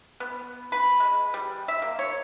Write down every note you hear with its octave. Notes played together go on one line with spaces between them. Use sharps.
B3
B4
G#3
G3
E5
A#3
C#5